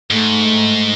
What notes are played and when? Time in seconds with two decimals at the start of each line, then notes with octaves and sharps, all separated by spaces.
0.11 G#2 A3